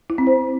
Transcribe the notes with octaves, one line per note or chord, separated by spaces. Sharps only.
E4
C4
C5